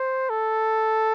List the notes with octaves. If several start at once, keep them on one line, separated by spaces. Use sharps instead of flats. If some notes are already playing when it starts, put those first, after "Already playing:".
Already playing: C5
A4